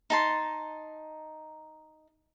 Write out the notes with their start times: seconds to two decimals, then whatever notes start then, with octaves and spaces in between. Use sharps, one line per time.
0.10 D#4 A5 C6